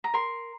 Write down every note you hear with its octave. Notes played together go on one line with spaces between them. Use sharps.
A#5
A#4 C6